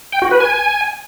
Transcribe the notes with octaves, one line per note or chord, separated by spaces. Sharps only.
G5
F#4
B4
G#5